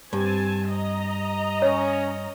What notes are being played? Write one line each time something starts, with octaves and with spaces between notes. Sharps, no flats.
G2 C4 G#5 A5
D#5 A#5
C#4 C#5